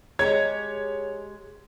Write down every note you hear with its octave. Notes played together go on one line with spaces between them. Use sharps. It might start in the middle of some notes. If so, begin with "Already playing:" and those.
G#3 G4 C#5 A#5 G#6